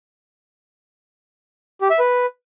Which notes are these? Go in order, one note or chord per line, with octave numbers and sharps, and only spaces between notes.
G4
E5
B4